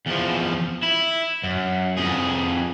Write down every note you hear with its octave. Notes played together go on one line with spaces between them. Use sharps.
E2 F3
E4
F#2
F2 G#4